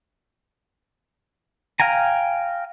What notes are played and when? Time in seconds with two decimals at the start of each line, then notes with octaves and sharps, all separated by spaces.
1.80 F5 G5 G#5 A#5